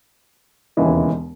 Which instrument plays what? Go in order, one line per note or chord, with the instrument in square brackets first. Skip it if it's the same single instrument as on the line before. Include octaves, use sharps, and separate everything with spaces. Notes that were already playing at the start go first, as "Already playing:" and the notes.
[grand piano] E1 D#2 C#3 E3 G#3